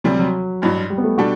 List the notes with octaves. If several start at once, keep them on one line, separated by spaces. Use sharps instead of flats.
D2 C3 F#3 G3
F#3
A1 G2 F#3
G3
B3
A3
B2 G3 D4 F#4 A4